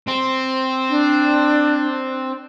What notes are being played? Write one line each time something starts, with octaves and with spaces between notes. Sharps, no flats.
C4
D4